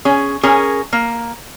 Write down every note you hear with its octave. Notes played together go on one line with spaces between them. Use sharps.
C#4 G#4
C#4 G#4 A#4
A#3